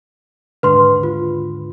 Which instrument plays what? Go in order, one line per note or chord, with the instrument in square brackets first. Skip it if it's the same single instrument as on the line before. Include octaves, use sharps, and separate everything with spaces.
[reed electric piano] D#2 G#2 D3 [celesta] B4 C6
[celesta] F4